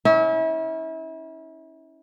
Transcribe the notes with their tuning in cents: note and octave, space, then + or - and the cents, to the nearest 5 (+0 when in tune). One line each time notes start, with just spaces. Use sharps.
C#4 +0 E4 -35